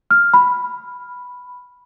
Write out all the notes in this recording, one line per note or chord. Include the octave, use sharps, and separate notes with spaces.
F6
B5